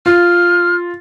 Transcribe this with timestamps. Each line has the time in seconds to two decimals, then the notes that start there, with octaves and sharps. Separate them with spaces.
0.06 F4 F6